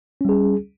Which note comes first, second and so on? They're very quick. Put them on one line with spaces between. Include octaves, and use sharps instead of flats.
C#4 G3 G#4